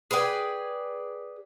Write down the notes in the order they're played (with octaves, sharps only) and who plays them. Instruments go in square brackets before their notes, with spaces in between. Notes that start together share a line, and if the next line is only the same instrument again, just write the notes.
[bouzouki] G#4 B4 D5 G5